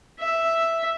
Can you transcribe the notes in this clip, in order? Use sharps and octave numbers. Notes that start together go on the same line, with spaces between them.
E5